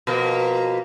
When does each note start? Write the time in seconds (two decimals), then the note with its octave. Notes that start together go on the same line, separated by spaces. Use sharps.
0.07 B2 F3 A#3